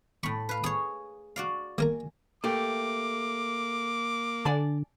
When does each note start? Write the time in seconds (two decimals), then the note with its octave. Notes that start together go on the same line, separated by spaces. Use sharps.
0.23 A2 B5 C#6
0.49 B4 F5
0.64 G#4 C#5 D#6
1.36 F#4 D5 F5
1.78 A#3 A#4 G#5 A#5
2.44 A3 A#3 G4 D6
4.45 D3 D5 G#5 A5